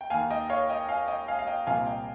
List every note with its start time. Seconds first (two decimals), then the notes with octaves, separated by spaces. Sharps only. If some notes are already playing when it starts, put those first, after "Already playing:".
0.01 G5
0.10 D#2 D#3 F5 G#5
0.30 D#5 G5
0.50 C#5 F5
0.69 D#5 G5
0.89 F5 G#5
1.08 D#5 G5
1.28 F5 G#5
1.39 F5
1.47 D#5 G5
1.67 C2 A#2 F3 F5 G#5
1.86 D#5 G5